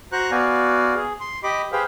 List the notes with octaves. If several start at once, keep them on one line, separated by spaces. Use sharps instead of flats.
F#4 C5 A#5 C#6 F#6
B3 F#4 D5 F5 G#5
G#4
C6
G4 D#5 B5 D6
G4 G#4 B4 C5 F5 G5